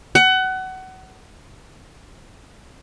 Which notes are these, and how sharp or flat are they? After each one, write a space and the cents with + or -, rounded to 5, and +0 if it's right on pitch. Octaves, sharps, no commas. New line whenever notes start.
F#5 +25